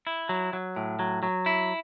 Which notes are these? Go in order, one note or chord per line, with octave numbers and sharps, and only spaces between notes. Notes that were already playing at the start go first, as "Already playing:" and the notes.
E4
F#3
F#3
A2
F#3
F#3
E4